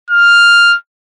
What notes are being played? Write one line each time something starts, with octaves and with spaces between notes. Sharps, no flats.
F6